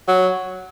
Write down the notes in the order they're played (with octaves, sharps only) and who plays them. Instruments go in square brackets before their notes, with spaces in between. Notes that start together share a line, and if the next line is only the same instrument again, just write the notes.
[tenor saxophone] F#3